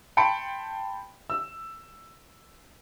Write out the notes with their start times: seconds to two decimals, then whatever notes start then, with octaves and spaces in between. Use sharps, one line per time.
0.17 G5 A5 B5 C6 C#7 D7
1.30 E6